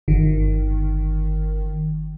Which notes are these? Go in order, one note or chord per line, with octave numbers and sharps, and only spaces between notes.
G1 D#3